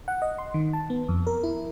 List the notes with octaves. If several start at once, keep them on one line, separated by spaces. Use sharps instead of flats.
F#5
D#5
C6
D#3
A5
B3
F2
A#4
E4